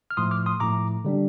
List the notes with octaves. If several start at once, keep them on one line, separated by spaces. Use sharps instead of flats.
F6
A2 F3 A3 C6 D#6
D6 F6
C6 D#6
A2 F3 A3 A#5 D6
D3 G3 D4